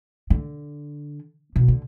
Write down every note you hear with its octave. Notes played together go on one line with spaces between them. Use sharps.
D3
B2
D3